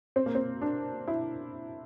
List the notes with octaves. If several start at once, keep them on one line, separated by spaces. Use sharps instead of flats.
C4
A#3
C4
D4
E4